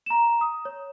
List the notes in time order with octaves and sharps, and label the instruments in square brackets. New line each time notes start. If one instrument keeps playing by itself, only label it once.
[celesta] A#5 E7
D#6
C#5